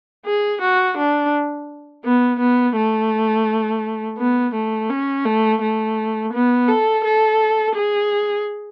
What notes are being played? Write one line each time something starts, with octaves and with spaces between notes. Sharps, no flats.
G#4
F#4
D4
B3
B3
A3
B3
A3
C#4
A3
A3
B3
A4
A4
G#4